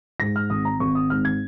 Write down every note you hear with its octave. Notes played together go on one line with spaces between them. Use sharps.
G#2 A#6
F6
G#1 D#6
A#5
G#1 C#6
D#6
G#2 F6
G#6